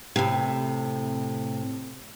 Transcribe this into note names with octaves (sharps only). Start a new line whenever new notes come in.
A2 C3